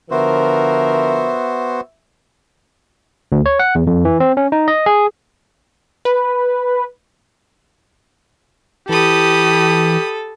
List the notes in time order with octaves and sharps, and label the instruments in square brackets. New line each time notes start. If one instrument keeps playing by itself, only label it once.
[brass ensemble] D3 F3 A#4 [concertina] B3 F#4 C5 [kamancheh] E5
[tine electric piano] D2
C#5
F#5
E2
F2
E3
C4
C#4
D#4
D#5
G#4
[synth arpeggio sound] B4
[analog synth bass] E3 [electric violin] G4 [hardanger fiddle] A4 [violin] B5 D#6